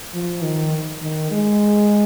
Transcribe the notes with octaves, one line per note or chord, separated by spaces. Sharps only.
F3
D#3
D#3
G#3